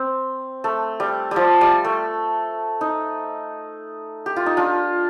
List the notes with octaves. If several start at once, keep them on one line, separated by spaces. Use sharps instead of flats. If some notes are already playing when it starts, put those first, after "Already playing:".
Already playing: C4
A3
G3
F3 G3
G3
A3
D#4
G4
F4
D#4
D4 F4